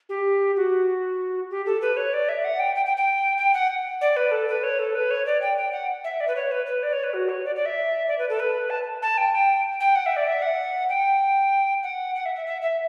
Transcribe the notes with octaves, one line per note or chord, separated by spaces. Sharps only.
G4
F#4
G4
A4
B4
C#5
D5
E5
F#5
G5
G5
G5
G5
G5
F#5
D5
B4
A4
B4
C#5
A4
B4
C#5
D5
G5
G5
F#5
E5
D5
B4
C#5
B4
B4
D5
C#5
B4
F#4
C#5
D5
D5
E5
D5
B4
A4
B4
A5
A5
G5
G5
G5
F#5
E5
D5
E5
F#5
G5
F#5
F#5
E5
E5
E5
E5